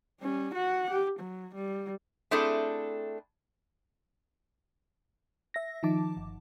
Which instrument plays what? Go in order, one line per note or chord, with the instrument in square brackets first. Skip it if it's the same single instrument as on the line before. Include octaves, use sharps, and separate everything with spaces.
[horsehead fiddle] G3 C#4
F#4 F#5
G4
F#3
G3
[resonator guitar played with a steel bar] A3 C4 D4 E4 G#4 A4
[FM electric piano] E5 A#6
D#3 F3 D#4 A5 D6
G1